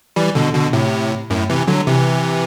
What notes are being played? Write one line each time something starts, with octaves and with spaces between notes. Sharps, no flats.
E3 G3
B2 D3
B2 D3
A2 C3
F#2 A2
C3 E3
D3 F#3
C3 E3